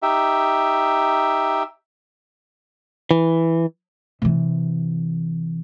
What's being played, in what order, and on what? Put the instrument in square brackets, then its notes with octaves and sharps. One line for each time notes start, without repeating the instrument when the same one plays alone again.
[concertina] D#4 G4 E5
[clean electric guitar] E3
[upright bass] C3 E3